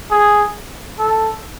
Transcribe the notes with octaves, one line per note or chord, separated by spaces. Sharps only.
G#4
A4